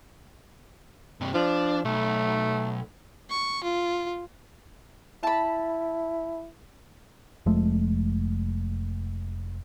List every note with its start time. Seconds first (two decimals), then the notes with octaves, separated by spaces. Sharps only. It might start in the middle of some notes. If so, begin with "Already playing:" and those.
1.21 G2 C3
1.34 F3 D4
1.85 B1 A3
3.30 C#6
3.64 F4
5.23 E4 A5 B5
7.46 F1 F3 G#3 A3